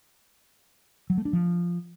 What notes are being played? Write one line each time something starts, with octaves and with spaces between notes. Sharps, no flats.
F#3
A3
D4
F3